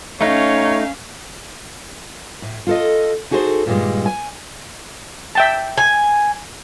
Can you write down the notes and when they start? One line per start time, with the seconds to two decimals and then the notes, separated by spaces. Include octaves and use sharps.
0.21 A3 C#4 D#4 C#5 F5
2.42 A2
2.67 F4 A4 D#5
3.31 D#4 F#4 G#4 A4 C5
3.66 G2 A#2 D#3 F3 G3 G#3
4.06 G#5
5.35 E5 G5 A5
5.78 G#5